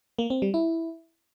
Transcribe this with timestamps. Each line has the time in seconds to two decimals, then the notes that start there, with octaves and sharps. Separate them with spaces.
0.19 A#3
0.30 C4
0.42 G3
0.54 E4